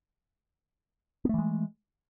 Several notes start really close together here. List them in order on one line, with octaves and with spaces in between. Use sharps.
B3 A3 E3 G#3